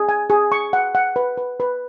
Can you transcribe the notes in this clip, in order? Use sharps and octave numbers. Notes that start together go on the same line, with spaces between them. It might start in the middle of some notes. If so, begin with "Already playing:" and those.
Already playing: G#4
G#5
G#4
C#6
F#5
F#5
B4
B4
B4